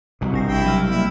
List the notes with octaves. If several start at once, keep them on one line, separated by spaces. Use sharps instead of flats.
C2 B2
A1 D4 A#6 C7
E4 G5
F#3 E5 F6
G3 A#3 E4